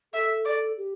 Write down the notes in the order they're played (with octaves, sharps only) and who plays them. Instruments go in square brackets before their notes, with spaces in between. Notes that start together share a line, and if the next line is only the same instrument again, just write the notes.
[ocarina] A4 [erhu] E5
[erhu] D5
[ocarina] G4